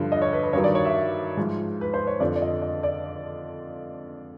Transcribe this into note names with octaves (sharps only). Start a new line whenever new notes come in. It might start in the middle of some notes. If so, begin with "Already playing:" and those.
Already playing: G2 D3 F3
D#5
C#5
B4
B4
G2 D#3 F#3 C#5
D5
C#5
E5
G#2 F3
B4
C5
C#5
F2 D3 F3 D5
D5
D#5
D#5
D5